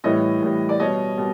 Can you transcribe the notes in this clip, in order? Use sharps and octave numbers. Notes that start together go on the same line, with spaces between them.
A2 E3 G3 C#5 D#5
A2 E3 G3
D5
B2 G3 C#5 D#5
B2 G3